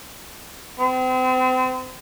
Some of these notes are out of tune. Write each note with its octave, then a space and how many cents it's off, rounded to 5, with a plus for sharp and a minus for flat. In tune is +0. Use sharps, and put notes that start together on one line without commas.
C4 -35